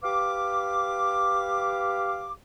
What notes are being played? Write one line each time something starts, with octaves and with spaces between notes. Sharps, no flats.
G4 B4 F5 D6